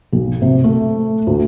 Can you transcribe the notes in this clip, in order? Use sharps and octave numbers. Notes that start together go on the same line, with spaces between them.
B1
C3
A3
D2